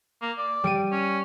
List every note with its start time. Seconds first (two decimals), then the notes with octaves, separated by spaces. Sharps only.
0.22 A#3
0.38 D5
0.64 G3 D7 D#7
0.92 C#4